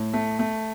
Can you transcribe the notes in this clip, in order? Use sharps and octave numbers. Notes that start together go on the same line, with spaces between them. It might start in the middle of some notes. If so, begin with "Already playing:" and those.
Already playing: A2
A3
A3